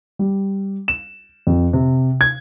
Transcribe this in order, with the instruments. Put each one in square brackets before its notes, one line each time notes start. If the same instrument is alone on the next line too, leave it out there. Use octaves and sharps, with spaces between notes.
[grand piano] G3
E7
F2
C3
G#6